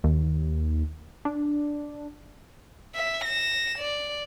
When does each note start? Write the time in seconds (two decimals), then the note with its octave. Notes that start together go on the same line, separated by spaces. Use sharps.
0.04 D#2
1.25 D4
2.95 E5
3.24 A#6 E7
3.79 D5